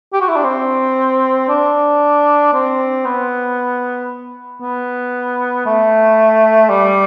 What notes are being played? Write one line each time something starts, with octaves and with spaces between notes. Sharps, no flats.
G4
F#4
E4
D4
C4
D4
C4
B3
B3
A3
G3